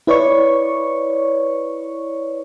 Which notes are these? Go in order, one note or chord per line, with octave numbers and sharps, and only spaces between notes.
E4 B4 C#5 D5 C#6